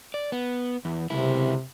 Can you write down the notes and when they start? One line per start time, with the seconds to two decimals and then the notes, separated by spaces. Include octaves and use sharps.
0.14 D5
0.32 B3
0.85 E2
1.10 C#2 C3 E4